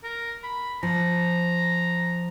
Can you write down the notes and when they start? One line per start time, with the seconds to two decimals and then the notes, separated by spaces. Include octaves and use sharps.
0.03 A#4
0.43 B5
0.83 F3 A#5